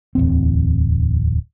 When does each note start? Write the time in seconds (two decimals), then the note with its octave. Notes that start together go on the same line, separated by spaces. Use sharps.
0.15 D1 E2 C4